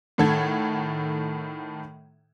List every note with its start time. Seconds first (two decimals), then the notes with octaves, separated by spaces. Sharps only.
0.18 A2 D#3 A4 F#5 G#6